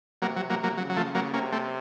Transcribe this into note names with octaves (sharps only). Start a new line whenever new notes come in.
C3 F#3 A#3
F#3
F#3 A#3
F#3 A#3
C#3 F#3
F#3
F3 A3
F#3 A#3
C3 A#3 C#4
A3 C4